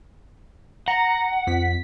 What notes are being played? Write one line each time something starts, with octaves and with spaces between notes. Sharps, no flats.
F#5 A#5
F2 B6